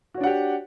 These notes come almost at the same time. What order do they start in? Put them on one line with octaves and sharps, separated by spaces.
F#4 C#5 D4 F#5 G4